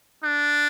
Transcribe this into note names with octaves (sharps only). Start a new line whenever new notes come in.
D4